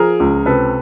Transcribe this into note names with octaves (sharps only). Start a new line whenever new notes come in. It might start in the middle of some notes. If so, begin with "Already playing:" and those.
Already playing: F3 G#4 A#4
C#2
C3 A4 B4